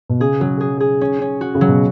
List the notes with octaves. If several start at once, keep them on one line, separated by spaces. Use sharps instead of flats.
B2
C#3 G#4
C#3 F#3
G#4
G#4
C#4
C#4
F#4
C#3
F#3
B2